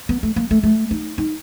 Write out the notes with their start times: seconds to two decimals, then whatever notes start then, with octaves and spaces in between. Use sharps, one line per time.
0.09 B3
0.23 A3
0.36 A#3
0.51 A3
0.63 A3
0.91 D#4
1.18 D#4